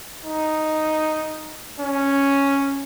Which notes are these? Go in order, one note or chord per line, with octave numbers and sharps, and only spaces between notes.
D#4
C#4